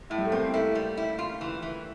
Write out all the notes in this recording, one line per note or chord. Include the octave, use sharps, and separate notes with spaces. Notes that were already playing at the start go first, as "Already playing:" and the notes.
A2 E4
G3
A3
A#3 C4
A3 E4
G3
E4
F4
E3
E3